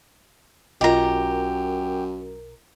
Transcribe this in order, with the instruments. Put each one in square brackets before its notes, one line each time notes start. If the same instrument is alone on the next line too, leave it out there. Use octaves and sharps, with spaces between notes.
[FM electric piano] B1 A#4 [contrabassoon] F#2 [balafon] F4 D#5 [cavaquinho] G4 A#5